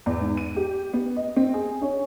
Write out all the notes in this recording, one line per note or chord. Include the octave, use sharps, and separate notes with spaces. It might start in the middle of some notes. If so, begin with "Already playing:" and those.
E2
G#2
D#7
G4
B3
D#5
C4
G#4
C#4